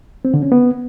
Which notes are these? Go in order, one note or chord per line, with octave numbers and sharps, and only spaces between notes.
C4
D3
C#4
B3